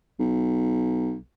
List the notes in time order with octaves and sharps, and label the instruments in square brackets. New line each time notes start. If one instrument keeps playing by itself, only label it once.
[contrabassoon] B1